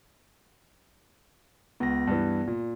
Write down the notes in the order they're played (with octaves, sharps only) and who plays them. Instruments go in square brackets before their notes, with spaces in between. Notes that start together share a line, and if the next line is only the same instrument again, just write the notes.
[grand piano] C#2 [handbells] B3 A#6
[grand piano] G2 E3
A#2